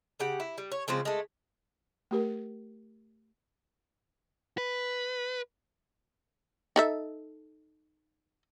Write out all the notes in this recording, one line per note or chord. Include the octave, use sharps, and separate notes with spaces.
C#3 G4 F#5
E4
G3
C#5
C#3 F3 G#3 C4
G#3 A3
A3 G4 A#4
B4
D#4 A4 E5